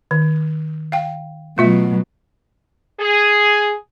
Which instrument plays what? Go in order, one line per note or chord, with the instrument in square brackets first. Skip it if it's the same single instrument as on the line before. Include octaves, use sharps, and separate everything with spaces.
[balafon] D#3
F5 G5
[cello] B2 F#3 [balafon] A3 F4 E5
[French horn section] G#4